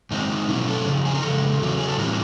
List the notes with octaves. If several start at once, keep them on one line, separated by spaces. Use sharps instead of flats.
F#2 D#3 G#3 C4 D#4
D#4
B2 F#3 A3 C#4 E4
A4
F2 C#3 G#4
G#4
A#4
F2 C#3 G#3 A4
E2 C#3 F#3
G#4
A4
A2 E3 G3 C4 A#4